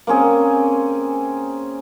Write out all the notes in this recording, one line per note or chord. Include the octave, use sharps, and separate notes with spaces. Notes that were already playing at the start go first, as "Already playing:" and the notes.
A#3 C4 C#4 G#4